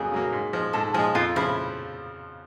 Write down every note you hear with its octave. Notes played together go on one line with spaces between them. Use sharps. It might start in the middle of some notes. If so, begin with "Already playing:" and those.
Already playing: F2 C#3 F#3 A#3 G#4
C#3 F#3 A#3
G#2
F3 G#3
G#2 A4
F3 G#3 G#4
F2 F4
C#3 F3 E4